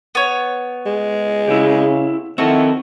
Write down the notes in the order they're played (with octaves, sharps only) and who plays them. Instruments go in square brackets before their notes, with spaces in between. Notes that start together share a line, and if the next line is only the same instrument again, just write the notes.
[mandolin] B3 C#5
[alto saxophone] G#3
[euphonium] C#3 [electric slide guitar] E4 G4
[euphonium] D#3 [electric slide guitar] C4 A4 [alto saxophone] E4 [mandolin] F#4